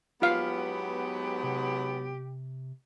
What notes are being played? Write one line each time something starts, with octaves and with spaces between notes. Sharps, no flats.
G#2 F#3 B3 F4 G4 F5
C3